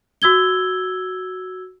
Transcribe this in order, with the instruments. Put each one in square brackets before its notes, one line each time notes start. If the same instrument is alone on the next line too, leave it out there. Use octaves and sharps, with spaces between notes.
[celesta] F#4 E6 G#6 G7